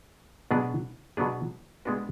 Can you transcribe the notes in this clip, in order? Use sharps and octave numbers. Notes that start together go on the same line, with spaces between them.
B2 F#3 B3 D4 G#4
B2 F#3 B3 D4 G#4
G#3 B3 D4 F#4 B4